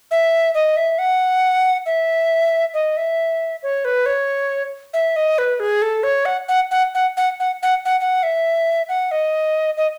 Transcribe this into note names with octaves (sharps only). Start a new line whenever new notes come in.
E5
D#5
E5
F#5
E5
D#5
E5
C#5
B4
C#5
E5
D#5
B4
G#4
A4
C#5
F#5
F#5
F#5
F#5
F#5
F#5
F#5
F#5
F#5
E5
F#5
D#5
D#5